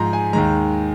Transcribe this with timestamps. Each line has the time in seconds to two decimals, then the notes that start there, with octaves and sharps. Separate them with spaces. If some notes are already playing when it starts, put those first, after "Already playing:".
Already playing: G#2 F3 G#3 A#5 C6
0.13 G#5
0.33 D#2 D#3 G#3 A#5